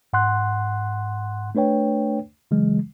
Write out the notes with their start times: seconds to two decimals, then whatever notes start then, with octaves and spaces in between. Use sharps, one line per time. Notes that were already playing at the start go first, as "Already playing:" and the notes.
0.13 G#2 F#5 C6 F#6
1.55 A3 D4 B4 C#5 G5
2.51 C#3 E3 F#3 G#3